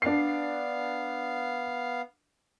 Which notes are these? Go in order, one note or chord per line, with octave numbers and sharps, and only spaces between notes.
B3 D4 F5 C7